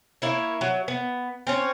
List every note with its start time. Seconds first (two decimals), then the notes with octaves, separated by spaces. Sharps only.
0.22 A#3 E4 C#5
0.61 F#3
0.88 B3
1.47 C4 C#4 C#5